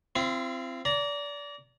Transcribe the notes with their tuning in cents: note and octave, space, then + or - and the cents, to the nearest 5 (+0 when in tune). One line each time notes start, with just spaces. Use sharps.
C4 -5 F4 -45
D5 -30 A#5 -5